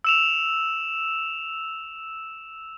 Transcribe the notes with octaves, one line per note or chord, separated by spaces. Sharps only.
E6 E7 F7